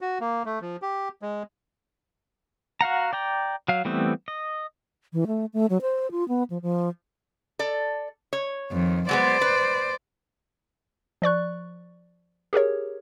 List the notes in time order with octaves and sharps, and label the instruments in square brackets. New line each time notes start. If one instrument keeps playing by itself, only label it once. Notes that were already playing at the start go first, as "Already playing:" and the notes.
[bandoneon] F#4
A#3
A3
F3
G4
G#3
[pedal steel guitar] F#4 F5 F#5 A#5
D5 G5 A#5
F#3 F5
E3 G3 A3 B3 C4
D#5
[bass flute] E3
A3
A3
F#3
C5
F4
B3
F3
F3
[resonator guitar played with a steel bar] A4 D5
C#5
[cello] F2 D#3
[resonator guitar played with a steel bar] F#3 G#3 B3 [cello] C5 D5
[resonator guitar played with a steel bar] B4
[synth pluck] F3 D5 C#6 F#6
G4 G#4 A#4 C#5